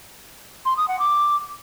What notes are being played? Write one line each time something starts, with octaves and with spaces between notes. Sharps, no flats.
C6
D#6
F#5
D6